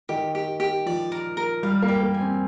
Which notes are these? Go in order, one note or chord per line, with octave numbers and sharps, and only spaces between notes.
D#3 G4
G4
G4
F3 D5
A#4
A#4
G3 F5
A#3
G4
A#3
G#5
C4